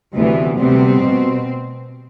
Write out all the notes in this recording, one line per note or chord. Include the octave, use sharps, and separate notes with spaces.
D2 C3 E3 B3
D2 C3 G3 B3 C4
B2